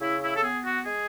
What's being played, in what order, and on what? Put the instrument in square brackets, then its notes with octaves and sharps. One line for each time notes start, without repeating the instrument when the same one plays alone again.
[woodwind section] C#3 E4
E4
A4
B3 G#4
F#4
G#3 G#4